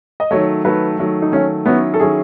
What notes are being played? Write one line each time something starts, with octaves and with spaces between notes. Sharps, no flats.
D#5
D#3 F#3 A3 C#5
D#3 F#3 A3 B4
D#3 F#3 A3
D#4
D#3 F#3 A3 C#4
D#3 F#3 B3 C#4 E4
A4
D#3 F#3 C#4 E4 G#4